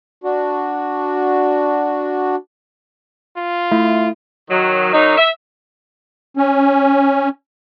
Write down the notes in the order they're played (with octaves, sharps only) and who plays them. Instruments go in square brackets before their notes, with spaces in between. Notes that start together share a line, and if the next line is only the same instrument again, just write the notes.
[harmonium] D4 F#4
[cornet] F4
[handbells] A3 [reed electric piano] E4
[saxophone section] D#3 F#3
F#2 F#3 D#4
E5
[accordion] C#4